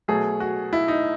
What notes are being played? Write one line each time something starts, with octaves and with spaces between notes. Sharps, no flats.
B2 F#3 A3 G#4
F#4
E4
D#4